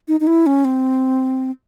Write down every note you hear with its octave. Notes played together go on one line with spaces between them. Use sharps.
D#4
D#4
E4
C#4
C4